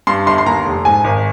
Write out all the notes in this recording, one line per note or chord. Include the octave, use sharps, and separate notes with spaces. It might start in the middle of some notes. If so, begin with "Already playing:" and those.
G2 C6
G1 C6
C6
D#2 A#5
F1
G#2 G#5
G#1